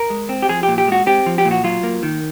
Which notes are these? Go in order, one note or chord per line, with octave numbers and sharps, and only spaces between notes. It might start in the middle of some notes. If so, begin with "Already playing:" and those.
Already playing: A#4
G#3
C4
G4
F3 G#4
G4
A#2
G4
G#3 F#4
C4 G4
F3
G4
A#2
F#4
F#3 F4
A#3
D#3